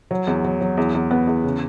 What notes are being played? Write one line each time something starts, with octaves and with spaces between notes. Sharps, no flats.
F#3
E2
F#3
F#3
E2
E2
B3
E2
C#3